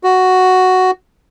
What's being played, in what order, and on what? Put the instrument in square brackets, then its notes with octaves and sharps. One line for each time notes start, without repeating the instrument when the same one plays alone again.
[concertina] F#4